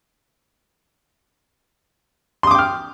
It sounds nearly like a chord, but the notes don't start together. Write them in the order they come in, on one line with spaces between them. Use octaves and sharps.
C6 D#6 D6 G5 F6